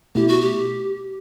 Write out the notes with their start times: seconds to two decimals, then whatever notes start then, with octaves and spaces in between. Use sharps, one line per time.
0.15 B2 A3 E4 G4
0.28 F#4
0.41 G4